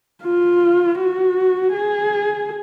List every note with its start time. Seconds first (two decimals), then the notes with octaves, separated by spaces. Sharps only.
0.24 F4
0.99 F#4
1.74 G#4